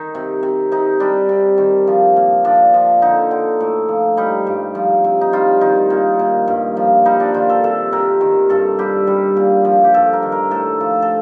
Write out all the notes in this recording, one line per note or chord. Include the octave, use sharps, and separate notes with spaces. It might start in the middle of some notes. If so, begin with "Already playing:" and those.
Already playing: D#3 D#4
C3
C3
C3 D#4
G3 D4
C3
D#3
F3
A#2
F3 D4
F3
D3 D#4
D3
A2
F3
G3 D#4
G2
F3
C3
D#4
G3 F4
D#3 D#4
A#2
A#2
G2
F3
G3 D#4
D4
D#3 F4
A4
C3 A4
C3 A#4
D#3
G2 A4
G3 G4
G3
A#2
F3
G4
G2 A4
A#4
D#3
A#4
A2 A4
F3
A4